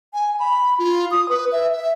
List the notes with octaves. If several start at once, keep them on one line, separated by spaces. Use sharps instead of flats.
G#5
B5
F4
D#6
B4
E5
E5